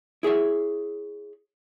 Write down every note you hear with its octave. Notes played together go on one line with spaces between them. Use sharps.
E4 G#4 C#5 E5